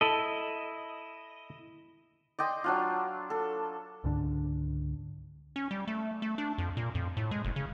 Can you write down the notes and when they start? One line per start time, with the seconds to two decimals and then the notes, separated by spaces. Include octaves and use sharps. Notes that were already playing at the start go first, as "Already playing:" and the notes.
0.01 E4 A4 D#5
2.39 D5 D#5 G5 C6
2.64 F#3 D4 F4
3.30 A4
4.04 C#2 G#2 D3 D4
5.56 C#4
5.71 G3
5.87 A3
6.22 A3
6.38 D4
6.58 F2
6.77 A#2
6.95 F2
7.17 A2
7.31 G#3
7.44 F#1
7.56 C#3